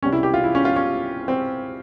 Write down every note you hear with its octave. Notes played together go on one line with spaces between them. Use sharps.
C2 C3 G3 C#4
E4
G4
F4
E4
C#4
F4
C#4
C4